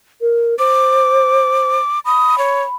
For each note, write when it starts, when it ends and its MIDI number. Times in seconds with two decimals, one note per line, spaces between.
0.21 0.57 70
0.59 1.78 72
0.59 1.99 86
2.05 2.76 83
2.05 2.38 87
2.38 2.63 73